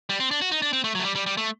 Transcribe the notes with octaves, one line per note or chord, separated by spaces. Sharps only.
G3
C4
D4
F#4
D#4
D4
C4
A3
F#3
A3
G3
G3
G3
A3